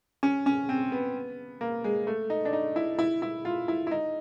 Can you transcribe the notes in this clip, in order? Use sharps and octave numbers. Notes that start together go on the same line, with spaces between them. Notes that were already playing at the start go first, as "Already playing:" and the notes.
C#4
C#4
C4
B3
A#3
G#3
A3
D#4
D4
D#4
E4
E4
E4
F4
E4
E4
D#4